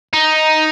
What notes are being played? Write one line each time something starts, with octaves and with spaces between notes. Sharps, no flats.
D#4